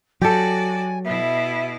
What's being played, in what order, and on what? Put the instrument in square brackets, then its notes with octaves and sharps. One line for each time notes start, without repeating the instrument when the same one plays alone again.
[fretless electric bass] F#3 [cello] F#4 D5 [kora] G4 A4 [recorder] G#5
[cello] B2 E4 [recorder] E5